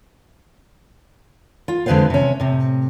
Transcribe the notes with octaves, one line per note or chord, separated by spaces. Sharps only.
F4
F2 D3 G#3 B4 C5 F5
C3 C#4
A2 C3